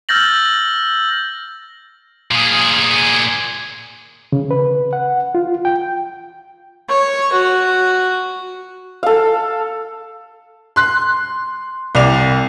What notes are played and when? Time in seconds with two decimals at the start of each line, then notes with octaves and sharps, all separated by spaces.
0.09 E6 F6 G6 A6 A#6 F#7
2.31 A#2 G#4
4.32 C#3
4.51 B4
4.93 F#5
5.35 F4
5.65 G5
6.89 C#5
7.32 F#4
9.03 A4 F5
10.76 C6 F#6
11.95 C2 D5 F7